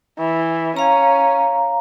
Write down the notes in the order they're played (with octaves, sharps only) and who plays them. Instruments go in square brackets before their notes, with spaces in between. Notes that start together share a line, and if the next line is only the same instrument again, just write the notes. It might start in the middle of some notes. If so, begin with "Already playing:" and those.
[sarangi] E3
[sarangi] C#4 [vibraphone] F5 A#5